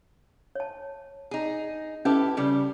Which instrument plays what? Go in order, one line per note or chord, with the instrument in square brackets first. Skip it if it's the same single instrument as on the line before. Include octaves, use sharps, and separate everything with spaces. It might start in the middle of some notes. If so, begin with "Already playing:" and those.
[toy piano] C#5 A5
[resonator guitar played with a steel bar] D#4 G#4
[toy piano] C#4 B4 [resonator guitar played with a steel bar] E4 G4 A4
[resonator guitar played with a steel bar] C#3 G3